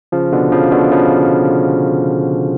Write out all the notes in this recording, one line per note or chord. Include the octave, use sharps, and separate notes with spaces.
C#3 F3
B2 D3
C#3 F3
B2 D3
C#3 F3